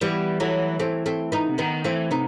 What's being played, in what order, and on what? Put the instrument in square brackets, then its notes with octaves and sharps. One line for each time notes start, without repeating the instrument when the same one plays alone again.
[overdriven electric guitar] E3 [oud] G3 B3
[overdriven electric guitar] E3 [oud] F#3 A3
[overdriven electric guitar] E3 [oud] A3 C4
[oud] A3 C4
B3 D#4
[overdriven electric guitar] C3
[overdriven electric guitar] D#3 [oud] B3 D#4
[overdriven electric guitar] E3 [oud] A3 C4
[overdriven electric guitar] C3 [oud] B3 D#4